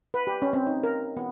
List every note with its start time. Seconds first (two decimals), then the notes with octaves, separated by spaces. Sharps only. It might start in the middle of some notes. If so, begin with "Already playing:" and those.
0.14 B4
0.27 G4
0.42 C#4
0.53 C4
0.67 D#4
0.84 A#4
1.17 B3